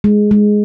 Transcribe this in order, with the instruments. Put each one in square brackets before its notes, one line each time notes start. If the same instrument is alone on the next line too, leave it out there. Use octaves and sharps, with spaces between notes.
[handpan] G#3
G#3